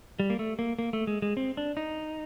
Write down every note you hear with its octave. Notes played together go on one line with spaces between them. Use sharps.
G3
A#3
A3
A#3
A#3
A3
G#3
G#3
C4
D4
D#4